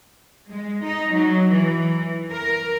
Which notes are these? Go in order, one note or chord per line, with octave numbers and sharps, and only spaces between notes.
G#3
D#4
F#3
E3
A#4